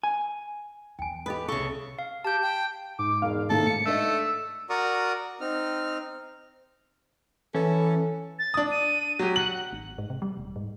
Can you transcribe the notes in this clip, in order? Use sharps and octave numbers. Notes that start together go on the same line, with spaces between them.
G#5
E2 G5 G#5
G4 A4 B4 D#5 F5
C2 C#3 A#3 A4 E5 F5 C#6
F5
G4 A5 G6
G5
G#2 D6
E1 G#3 F5
A2 C3 D#3 A#3 A4
F5 C#7
A3 D4 A4 D#5 E6
F#4 A#4 D5 A#5 C#6 D#6
C4 D#4 F6
E3 C#4 A4
A6
D4 D#6
D#7
F#3 G4
F#5 F#7
G#1
G#2
C3
G3
D#1
G#2